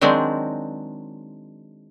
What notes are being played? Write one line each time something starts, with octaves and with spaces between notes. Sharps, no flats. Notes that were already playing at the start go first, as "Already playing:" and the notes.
D#3 F#3 G#3 C4 D4